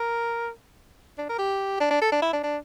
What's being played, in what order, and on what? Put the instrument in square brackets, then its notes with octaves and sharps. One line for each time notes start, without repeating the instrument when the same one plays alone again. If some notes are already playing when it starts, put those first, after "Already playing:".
Already playing: [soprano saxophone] A#4
D4
A#4
G4
D4
D4
A4
D4
E4
D4
D4